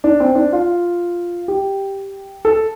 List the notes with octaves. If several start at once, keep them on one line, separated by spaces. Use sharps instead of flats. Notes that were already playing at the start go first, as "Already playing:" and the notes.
D4
C4
D4
F4
G4
A4